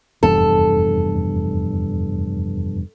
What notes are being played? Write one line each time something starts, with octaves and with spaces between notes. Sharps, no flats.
F1 E2 G2 A4